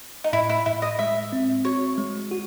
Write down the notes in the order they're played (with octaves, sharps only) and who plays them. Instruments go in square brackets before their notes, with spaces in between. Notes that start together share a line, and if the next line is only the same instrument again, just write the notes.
[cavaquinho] D#4
[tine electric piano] A2 [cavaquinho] E4
[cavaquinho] E4
[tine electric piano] A2 [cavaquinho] E4
[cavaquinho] D#5
[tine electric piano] G#3 [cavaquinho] E5
[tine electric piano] C4
[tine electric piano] F#4 [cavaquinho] C#5
[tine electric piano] G#3
F#4